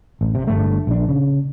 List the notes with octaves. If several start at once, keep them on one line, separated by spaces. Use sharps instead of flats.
A1
C3
G1 G2 A3
A#1 D4
C#3